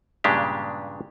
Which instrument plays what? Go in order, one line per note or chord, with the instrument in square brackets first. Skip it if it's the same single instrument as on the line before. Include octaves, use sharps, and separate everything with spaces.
[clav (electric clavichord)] G2 A#2 C#3 G#3 D4 G4